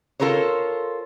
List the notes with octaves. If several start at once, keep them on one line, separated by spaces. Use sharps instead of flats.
F4 A4 A#4 C5 C#5